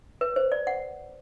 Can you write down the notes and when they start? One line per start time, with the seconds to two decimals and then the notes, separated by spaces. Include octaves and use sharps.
0.21 B4
0.36 C5
0.52 D5
0.67 F#5